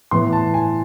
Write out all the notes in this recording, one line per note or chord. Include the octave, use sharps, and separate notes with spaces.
A2 E3 B3 C6
A5
G#5